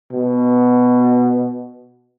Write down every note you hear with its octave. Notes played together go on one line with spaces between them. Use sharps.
B2